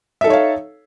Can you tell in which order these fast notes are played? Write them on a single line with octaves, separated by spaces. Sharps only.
E5 A4 D#4 C#5 F5